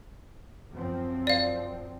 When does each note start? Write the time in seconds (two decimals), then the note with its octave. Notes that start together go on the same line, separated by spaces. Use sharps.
0.72 F#2 F3 C4
1.27 D5 F5